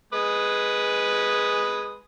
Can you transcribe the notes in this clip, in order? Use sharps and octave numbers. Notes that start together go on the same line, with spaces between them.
G#3 B4 D#6